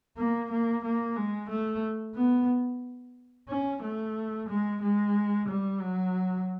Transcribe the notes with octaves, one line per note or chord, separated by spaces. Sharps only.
A#3
A#3
A#3
G#3
A3
B3
C#4
A3
G#3
G#3
G3
F#3